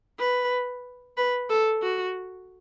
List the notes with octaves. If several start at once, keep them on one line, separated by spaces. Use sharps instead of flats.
B4
B4
A4
F#4